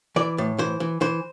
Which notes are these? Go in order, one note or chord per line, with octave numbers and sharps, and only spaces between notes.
E3 D5
A2
E3 C5
E3
E3 C5